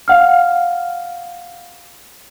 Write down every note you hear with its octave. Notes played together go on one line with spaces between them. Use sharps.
F5 F#5 F6